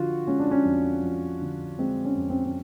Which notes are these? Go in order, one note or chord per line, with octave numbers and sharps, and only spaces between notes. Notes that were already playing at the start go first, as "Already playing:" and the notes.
Already playing: D3 F3 F4 F#4
G#3 C#4
D4
C#4
F2
F3
D3
G#3 C4
C#4
F2
C4
C4